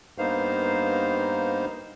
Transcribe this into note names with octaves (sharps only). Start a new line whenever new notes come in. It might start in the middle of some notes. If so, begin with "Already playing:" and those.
G2 A#3 B3 D#4 C5 F5